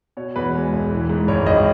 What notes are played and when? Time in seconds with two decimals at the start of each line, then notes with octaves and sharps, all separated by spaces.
0.17 B2 C#5
0.36 E2 B4
0.54 G#3
0.73 E1
0.91 E3
1.09 G#2
1.28 G#1 C#5
1.46 G#1 D#5